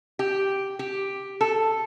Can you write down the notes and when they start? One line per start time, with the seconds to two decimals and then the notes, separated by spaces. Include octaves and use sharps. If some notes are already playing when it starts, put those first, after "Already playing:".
0.19 G4
0.79 G4
1.41 A4